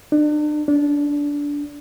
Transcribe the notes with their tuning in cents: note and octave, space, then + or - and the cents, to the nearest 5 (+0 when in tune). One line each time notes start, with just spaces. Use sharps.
D4 +35
D4 -20